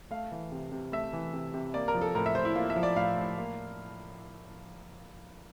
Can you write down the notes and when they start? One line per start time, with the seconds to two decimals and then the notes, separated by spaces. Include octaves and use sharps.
0.11 A3 F5
0.32 E3
0.52 C3
0.72 C3
0.92 A3 E5
1.13 E3
1.33 C3
1.54 C3
1.74 A#3 D5
1.88 A#4
1.95 F3
2.01 A4
2.15 A2 A#4
2.26 E5
2.35 A2 C5
2.45 E4
2.56 A#3 F4
2.70 E5
2.76 F3
2.83 D5
2.96 A2 F5
3.17 A2
3.38 A#3